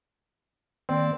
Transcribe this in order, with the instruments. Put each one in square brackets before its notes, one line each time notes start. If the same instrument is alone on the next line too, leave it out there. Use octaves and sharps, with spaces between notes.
[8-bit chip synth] D#3 A#3 D5 [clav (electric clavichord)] C4